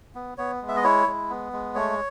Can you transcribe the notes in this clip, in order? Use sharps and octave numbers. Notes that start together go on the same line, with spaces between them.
B3
B3 C#5
G#3
E5
D#5
E4 C#5
G#3
B3
G#3
A3 C#5